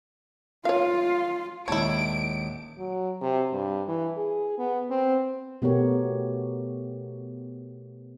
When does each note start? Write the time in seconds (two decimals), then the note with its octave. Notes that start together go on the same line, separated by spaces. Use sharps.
0.65 F4 C#5 F5
1.68 D#1 A#2 G#3 E4 C#5 A5 D7
2.78 F#3
3.22 C3
3.53 G2
3.88 E3
4.17 G#4
4.58 B3
4.90 C4
5.62 B2 A3 B3 G4 A#4 C#5